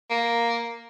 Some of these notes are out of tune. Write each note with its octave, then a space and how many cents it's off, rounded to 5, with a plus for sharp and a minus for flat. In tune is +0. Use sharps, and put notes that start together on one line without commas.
A#3 +0